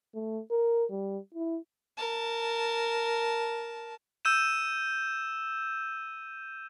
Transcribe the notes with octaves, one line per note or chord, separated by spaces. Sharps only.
A3
A#4
G3
E4
A#4 A5
E6 G6 D#7 E7